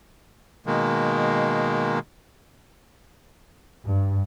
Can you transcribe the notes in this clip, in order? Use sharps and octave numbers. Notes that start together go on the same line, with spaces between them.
B2 D#3 G#3 A#3
G2